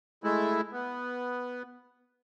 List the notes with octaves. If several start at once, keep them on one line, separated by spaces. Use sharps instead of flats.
G#3 A3 E4
B3